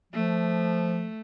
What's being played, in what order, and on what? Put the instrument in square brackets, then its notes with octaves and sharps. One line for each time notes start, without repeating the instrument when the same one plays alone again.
[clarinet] F3 [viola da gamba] A3